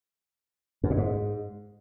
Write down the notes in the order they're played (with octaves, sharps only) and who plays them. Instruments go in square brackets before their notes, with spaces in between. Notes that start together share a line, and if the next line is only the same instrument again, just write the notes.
[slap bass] F#2
A#2
G#2